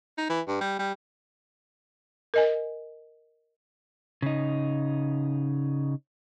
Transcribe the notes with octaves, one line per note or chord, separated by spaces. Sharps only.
D#4
E3
G2
G3
G3
A#4 D#5 G#5
C#3 D#4